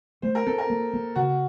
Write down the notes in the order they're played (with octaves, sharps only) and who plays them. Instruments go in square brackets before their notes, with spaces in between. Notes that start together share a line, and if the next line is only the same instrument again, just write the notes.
[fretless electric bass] A3 [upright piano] C5
[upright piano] A#4
[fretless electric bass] C4 [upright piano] A4
[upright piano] A#4
[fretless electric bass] A#3
A#3
[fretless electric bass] C#3 [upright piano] F#4